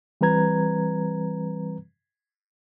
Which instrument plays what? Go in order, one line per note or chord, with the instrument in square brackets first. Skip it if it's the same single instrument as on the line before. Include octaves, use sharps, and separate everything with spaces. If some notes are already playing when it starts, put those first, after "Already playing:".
[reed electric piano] E3 G3 C4 B4 A#5 G#6